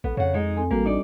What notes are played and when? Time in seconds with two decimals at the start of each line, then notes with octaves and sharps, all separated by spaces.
0.04 A#1 B3 A4
0.17 F2 C#3 F#5
0.34 G#3 D#4
0.57 C4 A4 G#5
0.71 A1 G3 A#3 F#4 A4
0.85 D4 D#4 D5